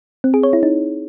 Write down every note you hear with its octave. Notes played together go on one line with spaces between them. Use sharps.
C4
G#4
C#5
E4
D#4